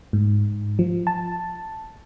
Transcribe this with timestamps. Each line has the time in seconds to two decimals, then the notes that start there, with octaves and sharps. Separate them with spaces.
0.13 G#2
0.79 F3
1.07 A5